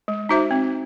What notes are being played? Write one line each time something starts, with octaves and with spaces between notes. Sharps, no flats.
G#3
D#4 F#4 C5 E5
C4